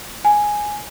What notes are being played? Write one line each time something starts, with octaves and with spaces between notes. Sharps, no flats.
G#5